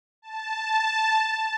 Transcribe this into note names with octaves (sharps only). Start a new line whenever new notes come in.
A5